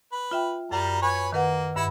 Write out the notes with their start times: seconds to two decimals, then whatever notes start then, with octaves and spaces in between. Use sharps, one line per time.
0.12 B4
0.31 F4 E5 G5
0.71 F#2 G3 A#4 A#5
1.02 B4 C#5 G#5
1.33 D#3 A#3 B4 F#5
1.76 G2 E4 F#5 B5 E6